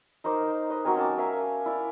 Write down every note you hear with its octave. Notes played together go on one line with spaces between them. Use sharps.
D#4 A#4 C5 D6
B4 D#5
F#3 C4 A#4 G#5
C#4 A5 D6
A#4 E5 F5 G#5
E4 D5 F5